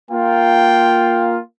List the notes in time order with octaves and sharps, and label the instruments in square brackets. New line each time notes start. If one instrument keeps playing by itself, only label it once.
[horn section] A#3 F4 [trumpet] G5